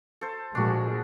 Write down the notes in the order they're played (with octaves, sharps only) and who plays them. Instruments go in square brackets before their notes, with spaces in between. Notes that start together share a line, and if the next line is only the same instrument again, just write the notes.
[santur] A4 C5
[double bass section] A#2 F3 G#3 [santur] D4 F#4